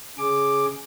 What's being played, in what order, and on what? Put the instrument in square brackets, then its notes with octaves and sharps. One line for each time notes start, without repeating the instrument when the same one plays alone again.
[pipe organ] C#3 G#4 D6